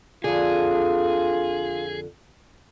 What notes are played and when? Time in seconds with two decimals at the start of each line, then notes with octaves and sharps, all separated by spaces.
0.24 F2 D3 F4 G#4